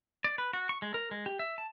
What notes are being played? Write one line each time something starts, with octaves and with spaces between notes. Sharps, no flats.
D5
B4
F#4
C#6
G#3
A#4
G#3
G4
E5
A5